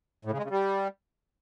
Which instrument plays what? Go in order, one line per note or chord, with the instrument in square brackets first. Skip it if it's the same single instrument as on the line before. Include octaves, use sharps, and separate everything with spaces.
[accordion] A2
C#3
G#3
C#3
G3